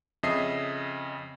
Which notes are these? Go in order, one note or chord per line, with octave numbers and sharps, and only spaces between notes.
F2 C#3 D#5 E5 D#6 C7